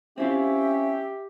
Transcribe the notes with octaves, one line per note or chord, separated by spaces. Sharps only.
C4 C#4 E4 F4 G4 E5